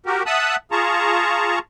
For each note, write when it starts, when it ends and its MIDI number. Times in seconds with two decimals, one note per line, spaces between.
0.06 0.23 66
0.06 0.23 67
0.06 0.23 70
0.26 0.56 76
0.26 0.56 78
0.26 0.56 81
0.26 0.56 87
0.26 0.56 88
0.26 0.56 90
0.72 1.59 65
0.72 1.59 68
0.72 1.59 81
0.72 1.59 82
0.72 1.59 85